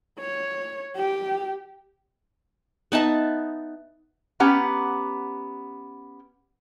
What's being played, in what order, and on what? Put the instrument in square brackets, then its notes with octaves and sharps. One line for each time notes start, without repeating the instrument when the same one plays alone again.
[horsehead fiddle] C#5
G4
[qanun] B3 D#4 E5 A5
[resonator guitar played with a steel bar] B3 C#4 G4 F#5 A#5